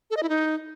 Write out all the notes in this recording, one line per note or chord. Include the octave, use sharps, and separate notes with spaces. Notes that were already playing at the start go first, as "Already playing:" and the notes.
A4
D#5
E4
D#4